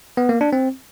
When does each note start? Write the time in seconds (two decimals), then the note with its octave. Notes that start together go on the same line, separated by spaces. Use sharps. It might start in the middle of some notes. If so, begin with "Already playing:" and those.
0.17 B3
0.29 A#3
0.41 D4
0.53 C4